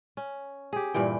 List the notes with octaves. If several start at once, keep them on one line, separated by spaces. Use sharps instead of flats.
C#4
G4 G#4
G2 A#2 E3 G5